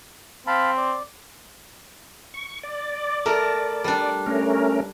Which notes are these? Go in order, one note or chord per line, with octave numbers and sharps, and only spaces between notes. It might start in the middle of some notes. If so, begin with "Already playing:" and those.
C4 F5 A5 B5
D5
C#6
D5
A3 A#4
G3 D4
A3 C#4 A#4